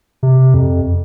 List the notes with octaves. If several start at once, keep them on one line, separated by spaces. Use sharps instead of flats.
C3
F2